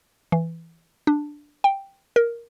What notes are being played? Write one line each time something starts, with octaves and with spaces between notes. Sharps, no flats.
E3
D4
G5
A#4